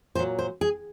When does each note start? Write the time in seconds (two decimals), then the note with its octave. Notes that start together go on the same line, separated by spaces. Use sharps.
0.15 A#2 C5
0.19 F#3
0.39 C5
0.61 G#4